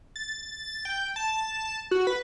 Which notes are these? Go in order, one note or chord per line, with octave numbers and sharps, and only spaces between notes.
A6
G5
A5
F#4
B4